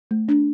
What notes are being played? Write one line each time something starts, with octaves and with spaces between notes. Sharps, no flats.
A3
D4